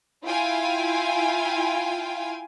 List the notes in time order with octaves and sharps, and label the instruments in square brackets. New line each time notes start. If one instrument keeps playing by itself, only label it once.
[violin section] E4 F4 F5 G5 G#5